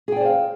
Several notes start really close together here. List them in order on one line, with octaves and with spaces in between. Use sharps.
G#4 G5 D5 C5 F5